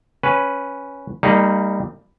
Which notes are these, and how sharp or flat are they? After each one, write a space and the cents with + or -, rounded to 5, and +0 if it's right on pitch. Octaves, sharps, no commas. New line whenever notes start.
C#4 +0 B4 +0
G3 +15 A#3 -35 D#4 +0